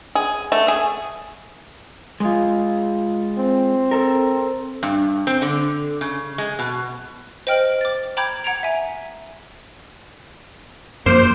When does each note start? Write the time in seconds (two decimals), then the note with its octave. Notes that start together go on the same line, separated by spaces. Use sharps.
0.15 G#4
0.52 A3
0.68 G#4
2.20 G#3 F4
3.38 C4
3.91 A4 A#4
4.83 G2
5.27 C4
5.42 D3
6.01 C#3
6.38 G#3
6.59 B2
7.47 C5 D#5 G5 F6 D7 F#7
7.81 D6 A6
8.17 G5 A#5 B5 D6 G6 G#6
8.44 F#5 A#5 G#6 D7 F7
8.63 E5 G#5
11.06 F#2 F3 A#3 C5